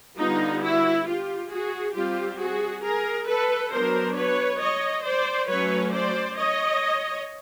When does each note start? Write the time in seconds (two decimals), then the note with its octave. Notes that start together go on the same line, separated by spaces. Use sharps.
0.17 D3 G3 B3 D#4 F4
0.62 E4 F#4
1.06 F4 G4
1.50 F#4 G#4
1.94 G3 C4 F4 G4
2.38 F#4 G#4
2.83 G#4 A#4
3.27 A4 B4
3.72 F#3 B3 D4 A#4 C5
4.16 B4 C#5
4.60 C#5 D#5
5.04 C5 D5
5.48 F#3 A3 C#4 B4 C#5
5.92 C5 D5
6.37 C#5 D#5